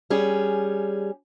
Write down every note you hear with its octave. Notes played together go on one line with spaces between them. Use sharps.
G3 C#4 G#4